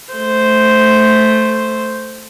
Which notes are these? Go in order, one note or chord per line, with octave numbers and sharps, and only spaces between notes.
A3 C5